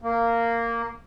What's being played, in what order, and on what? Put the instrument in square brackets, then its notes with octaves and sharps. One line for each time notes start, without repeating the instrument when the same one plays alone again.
[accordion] A#3